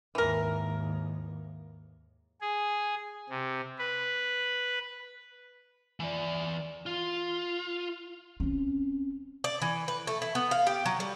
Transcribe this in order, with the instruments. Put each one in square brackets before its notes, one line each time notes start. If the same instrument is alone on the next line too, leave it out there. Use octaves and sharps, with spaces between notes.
[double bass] D#2 G#2 [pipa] E3 A#4
[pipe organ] G#4
C3
B4
[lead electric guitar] E3 D5
F4
[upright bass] C4 C#4
[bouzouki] D5
E3
B4
A3
E4
B3
F5
G4
F#3
G3